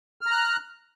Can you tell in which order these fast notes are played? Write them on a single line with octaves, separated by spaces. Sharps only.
F6 A#5 F#6